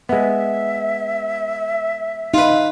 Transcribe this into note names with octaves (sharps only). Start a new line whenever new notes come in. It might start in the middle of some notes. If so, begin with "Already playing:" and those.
G#3 B3 E5
D#4 F4 B4